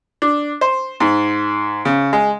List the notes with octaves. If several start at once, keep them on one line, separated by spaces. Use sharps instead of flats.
D4
C5
G#2
C#3
G#3